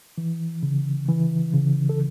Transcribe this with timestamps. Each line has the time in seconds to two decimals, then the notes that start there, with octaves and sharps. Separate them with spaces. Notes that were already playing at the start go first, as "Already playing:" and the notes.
0.18 E3
0.63 C#3
1.09 E3
1.54 C#3
1.89 A4